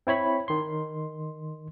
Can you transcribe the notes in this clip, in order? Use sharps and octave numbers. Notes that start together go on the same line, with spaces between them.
C4 E4 C#5 B5
D#3 C6